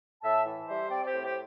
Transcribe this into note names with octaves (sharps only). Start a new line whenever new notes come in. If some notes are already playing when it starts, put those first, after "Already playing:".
A2 E5 A5
E3
G3 C5 E5
C4 D5 G5
D5
G4 C5
A2
G4 C5